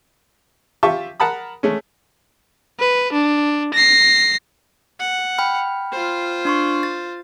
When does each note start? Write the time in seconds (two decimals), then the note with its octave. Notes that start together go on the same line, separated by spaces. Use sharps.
0.83 F4 G4 E5 A5 C#6
1.20 A#4 F#5 A5 B5 D#6
1.63 G#3 A3 C#4
2.79 B4
3.12 D4
3.73 A#6 C7
5.00 F#5
5.38 G5 B5 F6
5.92 F4 C5
6.45 D4 C6 C#6
6.83 A6